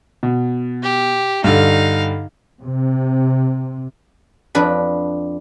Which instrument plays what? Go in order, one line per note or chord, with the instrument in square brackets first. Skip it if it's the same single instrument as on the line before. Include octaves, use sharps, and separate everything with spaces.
[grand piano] B2
[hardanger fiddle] G4
[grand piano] G2 D3 [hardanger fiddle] D#4 F5
[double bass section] C3
[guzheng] F2 D4 B4